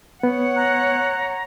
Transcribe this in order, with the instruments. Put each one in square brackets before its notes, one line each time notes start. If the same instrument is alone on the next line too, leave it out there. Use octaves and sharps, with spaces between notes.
[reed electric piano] B3 [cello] C#5 F#5
[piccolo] A#5 [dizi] F#6